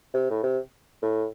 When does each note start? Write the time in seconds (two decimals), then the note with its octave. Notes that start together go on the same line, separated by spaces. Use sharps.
0.14 C3
0.30 A2
0.44 C3
1.02 A2